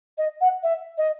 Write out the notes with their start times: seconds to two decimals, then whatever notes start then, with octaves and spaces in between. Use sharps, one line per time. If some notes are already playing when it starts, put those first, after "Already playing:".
0.17 D#5
0.40 F#5
0.62 E5
0.97 D#5